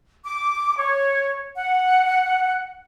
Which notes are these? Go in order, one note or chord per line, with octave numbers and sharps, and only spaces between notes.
D6
C#5
F#5